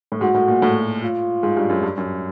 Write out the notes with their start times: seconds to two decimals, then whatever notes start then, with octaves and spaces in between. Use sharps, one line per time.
0.12 A2
0.20 G#2 F#4
0.34 A2
0.48 A#2
0.62 A2
1.03 F4
1.43 G#2
1.57 G2
1.70 F#2
1.83 G2
1.98 F#2